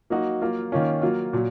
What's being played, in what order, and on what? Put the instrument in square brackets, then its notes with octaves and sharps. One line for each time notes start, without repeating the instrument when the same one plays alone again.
[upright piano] F#3 A#3 D#4 F#4
F#3 A#3 F4
D#3 A#3 C#4 F4
F#3 A#3 F4
A#2 F#3